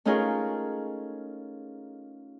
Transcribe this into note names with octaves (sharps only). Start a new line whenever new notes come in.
A3 C#4 D#4 F4 G#4 A#4